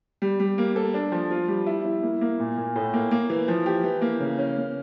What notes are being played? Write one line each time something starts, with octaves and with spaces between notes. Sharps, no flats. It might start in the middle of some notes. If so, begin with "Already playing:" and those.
G3
G3
A#3
A4
D4
F3
F4
G3
E4
E4
A#3
A#3
A#2
A#2
A2
A#3
A#3
E3
F3
G4
E3
A#3
C#3
C#4
A#3